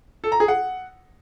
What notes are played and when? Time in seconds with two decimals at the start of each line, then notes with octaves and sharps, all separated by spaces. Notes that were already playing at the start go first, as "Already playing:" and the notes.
0.24 A4
0.32 A#5
0.40 G#4
0.48 F#5